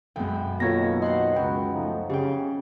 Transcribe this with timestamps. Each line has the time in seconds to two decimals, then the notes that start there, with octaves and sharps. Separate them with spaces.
0.16 B1 F#2 G#3 G5
0.60 B2 D#3 A#3 F4 A4 C#5 G#6 A#6
1.02 C5 D#5 F#5 C6
1.36 C#2 F#3 B3 F#4 G5
1.72 F3 A3 D#4
2.10 C#3 C4 G4 G5